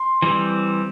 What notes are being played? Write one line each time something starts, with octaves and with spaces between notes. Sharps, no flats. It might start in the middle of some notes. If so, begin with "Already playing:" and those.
Already playing: C6
E3 G3 C4